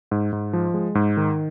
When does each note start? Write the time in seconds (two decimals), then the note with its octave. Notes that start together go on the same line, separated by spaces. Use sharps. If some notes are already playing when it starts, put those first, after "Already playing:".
0.11 G#2
0.33 G#2
0.53 F3
0.74 G#3
0.95 G#2
1.17 D#3